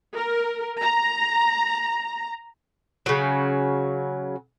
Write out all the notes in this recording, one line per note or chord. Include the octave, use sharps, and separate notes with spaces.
A#4
A#5
C#3 F#3